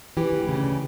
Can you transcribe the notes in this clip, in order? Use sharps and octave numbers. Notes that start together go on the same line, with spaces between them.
E3 G4
D2
C#3